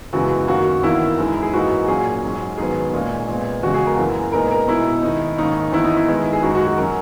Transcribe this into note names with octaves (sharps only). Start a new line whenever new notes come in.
F#2 C#3 E3 G#3 B3 F#4
F#2 D#3 A#3 F#4
E2 D#3 A#3 E4
F#2 E3 G#3 D#4
G#4
G#2 E3 A#3 D#4 F#4
A#2 F#3 C#4 G#4
G#2 F#3 C#4
G#2 D#3 F#3 B3 G#4
A#2 G#3 C#4
A#2 G#3 B3
E2 C#3 G#3 F#4
G#4
A#4
F#2 E3 A#3
A#2 G#3 B3 D#4 A#4
A#4
B2 G#3 D#4 E4
D#3 G#3 D#4
G#2 D#3 A#3 C#4 D#4
E2 D#3 A#3 E4
D#4
E4
D#3 G#3 B3 E4
G#4
F#2 D#3 G#3 D#4 F#4
F#4
F#4
F#3 C#4 A#4